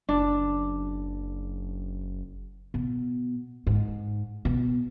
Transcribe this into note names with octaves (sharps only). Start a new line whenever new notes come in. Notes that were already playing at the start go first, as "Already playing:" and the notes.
F#1 D4
B2
G#2
B2